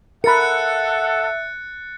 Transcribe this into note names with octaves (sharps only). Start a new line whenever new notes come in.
A4 A#4 E5 F#5 B5 F#6 A6 C#7